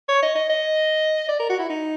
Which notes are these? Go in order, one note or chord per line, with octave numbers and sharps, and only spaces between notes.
C#5
D#5
D#5
D#5
D5
A#4
F#4
E4
D#4